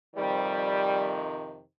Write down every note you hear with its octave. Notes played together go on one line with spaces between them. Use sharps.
F2 C3 D#3 G3